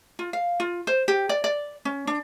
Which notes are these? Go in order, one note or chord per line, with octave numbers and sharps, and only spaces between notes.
F4
F5
F4
C5
G4
D5
D5
C#4
D4